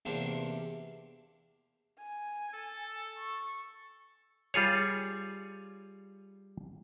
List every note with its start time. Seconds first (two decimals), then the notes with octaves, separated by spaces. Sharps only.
0.05 E2 C3 A#3 D4
1.99 G#5
2.54 A4
3.18 C#6
4.54 G3 F4 G#4 C#5